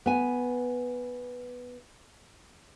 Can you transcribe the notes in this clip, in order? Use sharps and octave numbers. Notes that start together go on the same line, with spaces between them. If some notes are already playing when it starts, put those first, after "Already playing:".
B3 G#5